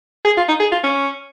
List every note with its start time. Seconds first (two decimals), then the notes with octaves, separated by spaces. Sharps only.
0.25 G#4
0.37 F4
0.48 D#4
0.60 G#4
0.72 F4
0.84 C#4